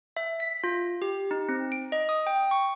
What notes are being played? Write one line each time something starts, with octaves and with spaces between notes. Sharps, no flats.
E5
B6
F4
G4
D#4
C4
D7
D#5
D#6
G5
C#6